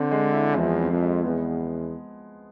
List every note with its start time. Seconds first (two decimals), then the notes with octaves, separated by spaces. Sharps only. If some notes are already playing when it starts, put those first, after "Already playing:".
Already playing: D3 C4
0.12 G#3
0.33 E4
0.57 E2 F3
0.80 C4
0.91 F2
1.02 G#3
1.24 E2 B3